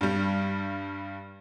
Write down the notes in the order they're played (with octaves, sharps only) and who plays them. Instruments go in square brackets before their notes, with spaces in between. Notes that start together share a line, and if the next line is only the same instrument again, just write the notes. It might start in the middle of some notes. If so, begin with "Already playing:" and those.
[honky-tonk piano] G2 G3